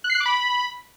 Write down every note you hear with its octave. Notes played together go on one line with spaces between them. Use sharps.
F#6
C7
F#6
D6
B5